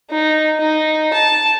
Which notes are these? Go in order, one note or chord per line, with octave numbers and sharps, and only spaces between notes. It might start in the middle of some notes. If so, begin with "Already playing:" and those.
D#4
D#4
A5